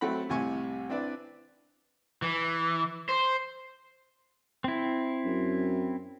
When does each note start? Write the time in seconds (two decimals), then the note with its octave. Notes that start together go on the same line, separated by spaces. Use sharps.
0.01 F#3 A3 C4 F#5 B5
0.29 C2 A2 C3 G#5 C#6
0.89 C4 D4 E4 B4 D5
2.22 E3
3.09 C5
4.64 C4 E4
5.25 F#2